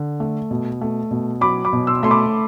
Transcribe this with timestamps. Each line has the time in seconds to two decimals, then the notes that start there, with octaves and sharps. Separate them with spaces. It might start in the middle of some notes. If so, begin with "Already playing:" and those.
Already playing: D3
0.20 A3
0.51 B2
0.81 A3
1.11 B2
1.41 F#3 B5 D6
1.65 B5 D6
1.73 B2
1.87 C6 E6
2.03 A3 C6
2.10 B5 D6